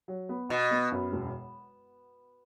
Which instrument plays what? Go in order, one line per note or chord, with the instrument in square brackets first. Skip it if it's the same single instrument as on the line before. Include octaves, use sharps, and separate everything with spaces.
[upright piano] F#3
B3
[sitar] B2 [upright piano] F#4
[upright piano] B3
F#2
E1